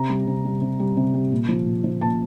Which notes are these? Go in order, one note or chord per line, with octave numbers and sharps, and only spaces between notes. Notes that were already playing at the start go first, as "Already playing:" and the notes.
Already playing: C3 A#5
G3
C3
G3
C3
G3
C3
G3
A#2
F3
A#2
F3
A#2 A5